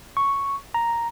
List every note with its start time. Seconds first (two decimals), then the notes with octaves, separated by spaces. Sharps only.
0.17 C#6
0.74 A#5